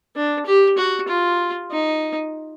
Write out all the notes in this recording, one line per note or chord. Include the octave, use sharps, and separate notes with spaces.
D4
G4
F#4
F4
D#4